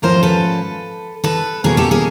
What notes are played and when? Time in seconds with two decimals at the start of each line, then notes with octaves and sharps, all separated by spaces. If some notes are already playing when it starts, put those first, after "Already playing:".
0.02 G#2 F3 A3 C#4 A#4 C5
0.23 A4 B4
1.24 A4 B4
1.64 B2 F#3 A#3 C#4 G#4 A#4
1.77 G4 A4
1.91 G#4 A#4